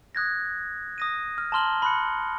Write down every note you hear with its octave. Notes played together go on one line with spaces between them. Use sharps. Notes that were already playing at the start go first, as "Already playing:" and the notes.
D#6 F#6 G#6 A#6
D#6 A#6 D#7
F6
A5 A#5 C6 F6 F#7 G7
B5 C6 F#6 C#7